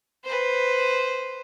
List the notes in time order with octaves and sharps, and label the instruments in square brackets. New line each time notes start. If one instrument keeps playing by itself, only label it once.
[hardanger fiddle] B4 C5